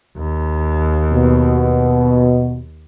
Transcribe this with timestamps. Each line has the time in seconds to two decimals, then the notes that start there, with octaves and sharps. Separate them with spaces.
0.17 D#2
1.13 B2